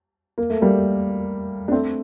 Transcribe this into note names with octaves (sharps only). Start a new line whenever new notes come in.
A#3
A3
G3 A#3
D4
A3 C4